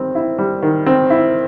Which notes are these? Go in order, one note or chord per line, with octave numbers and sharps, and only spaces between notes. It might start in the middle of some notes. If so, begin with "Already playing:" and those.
Already playing: D#3 G3 C4
E4
G3
D#3
C4
E4